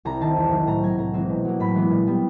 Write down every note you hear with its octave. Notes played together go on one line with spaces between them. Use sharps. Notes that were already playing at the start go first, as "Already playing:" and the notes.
C2 A#5
C3 D#3 A5
E2
C3 D#3 F#3
A2 A#5
F#3 A#3 G#5
A2 A#5
E3 G#3 C4
B2
F#3 A#3
A2 B5
E3 G#3 B3
A#2
G3 B3